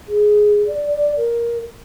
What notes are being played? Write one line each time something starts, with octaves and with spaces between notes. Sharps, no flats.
G#4
D5
D5
A#4